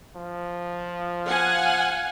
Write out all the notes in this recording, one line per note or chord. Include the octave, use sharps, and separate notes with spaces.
F3
F5 F#5 G#5